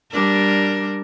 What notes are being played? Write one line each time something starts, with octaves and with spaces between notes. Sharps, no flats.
G3 D4 A#4